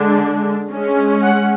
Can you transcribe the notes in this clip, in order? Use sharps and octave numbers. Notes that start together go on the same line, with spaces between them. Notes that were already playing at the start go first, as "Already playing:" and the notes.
Already playing: D3 G#3 D4
G#3 C#4
F#5